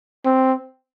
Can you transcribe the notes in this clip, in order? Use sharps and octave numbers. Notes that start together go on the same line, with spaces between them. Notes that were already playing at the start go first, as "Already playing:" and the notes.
C4